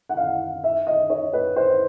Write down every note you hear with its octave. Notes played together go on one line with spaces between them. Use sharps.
F#5
F5
E5
D#5
C#5
B4
C5